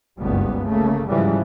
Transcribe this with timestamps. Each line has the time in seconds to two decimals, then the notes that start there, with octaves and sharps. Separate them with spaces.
0.19 F#1 C#2 G2 G3 B3
0.64 G1 C#3 A3 A#3
1.09 G#2 C#3 E3 F3 G3